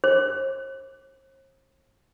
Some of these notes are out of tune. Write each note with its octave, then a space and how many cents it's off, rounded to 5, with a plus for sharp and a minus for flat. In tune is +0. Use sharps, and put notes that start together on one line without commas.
C5 +45